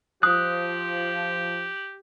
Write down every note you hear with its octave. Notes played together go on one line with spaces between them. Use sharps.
F3 G4 D#6 F#6